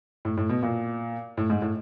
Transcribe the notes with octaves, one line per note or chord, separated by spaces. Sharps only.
A2
A2
B2
A#2
A2
G#2
A2